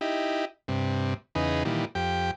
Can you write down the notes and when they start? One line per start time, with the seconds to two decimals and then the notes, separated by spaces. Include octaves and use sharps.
0.01 D#4 E4 G4
0.68 G2 C3
1.35 E2 C#3 D#4 G#4 B4
1.65 A#2 D#3 E3 G3
1.95 F2 G4 G5